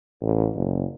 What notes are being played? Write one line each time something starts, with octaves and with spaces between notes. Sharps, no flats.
A1
F#1